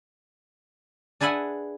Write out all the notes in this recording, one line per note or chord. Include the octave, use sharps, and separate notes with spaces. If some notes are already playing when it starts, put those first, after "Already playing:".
D4 G#4 B4 E5 F#5 G#5